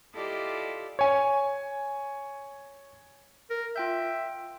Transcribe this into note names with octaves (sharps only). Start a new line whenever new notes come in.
E4 F4 G4 A4 D5 D#5
C#5 G#5
A#4
F4 E5 G5 G6